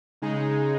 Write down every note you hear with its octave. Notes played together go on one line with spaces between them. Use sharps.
C#3 G#3 D#4 G#4